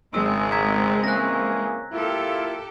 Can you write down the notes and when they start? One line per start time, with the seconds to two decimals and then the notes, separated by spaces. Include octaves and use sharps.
0.14 G#1 C#3 G#3 C4 E6
0.52 A#5 G#6 B6
1.04 E3 A#3 C#4 F#6 A#6
1.92 A#3 E4 F4 G4 A4